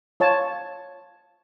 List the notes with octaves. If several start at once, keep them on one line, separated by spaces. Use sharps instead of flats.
F4 C#5 A5